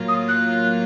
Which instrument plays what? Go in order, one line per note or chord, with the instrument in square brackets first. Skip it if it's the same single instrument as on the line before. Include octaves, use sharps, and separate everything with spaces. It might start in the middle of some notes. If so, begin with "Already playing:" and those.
Already playing: [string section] A2 F#3 A#3 F4
[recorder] D#6
F#6